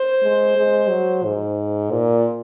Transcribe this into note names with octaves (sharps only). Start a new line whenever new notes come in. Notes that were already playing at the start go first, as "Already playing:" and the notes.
Already playing: C5
G#3
G#3
F#3
G#2
A#2